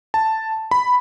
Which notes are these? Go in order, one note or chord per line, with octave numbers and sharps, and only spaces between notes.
A5
B5